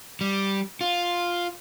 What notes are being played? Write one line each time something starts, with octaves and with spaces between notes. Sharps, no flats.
G3
F4